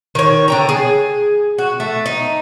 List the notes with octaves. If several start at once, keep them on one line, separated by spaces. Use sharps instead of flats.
D#3 C#5
D3 G5 A#5
G#4
F#4
A3
D#4